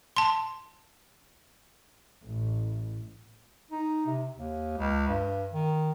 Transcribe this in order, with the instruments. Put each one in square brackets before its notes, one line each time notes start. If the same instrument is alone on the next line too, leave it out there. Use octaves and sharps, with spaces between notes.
[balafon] A5 C6
[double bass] A1
[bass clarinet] D#4
C3
D#2
C#2
G2
D#3